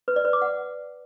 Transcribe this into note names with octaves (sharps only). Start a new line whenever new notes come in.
B4
D5
B4
D6
F#5